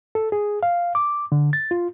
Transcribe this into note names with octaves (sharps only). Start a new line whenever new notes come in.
A4
G#4
F5
D6
D3
A6
F4